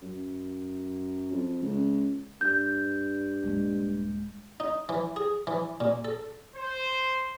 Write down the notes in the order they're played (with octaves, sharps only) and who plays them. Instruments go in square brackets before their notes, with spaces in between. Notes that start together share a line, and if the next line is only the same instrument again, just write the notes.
[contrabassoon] F#2
F2
C#2
[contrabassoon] G2 [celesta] G6
[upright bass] D#1 G#3
[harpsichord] D#4
E3
G#4
E3
A#2
A4
[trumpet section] C5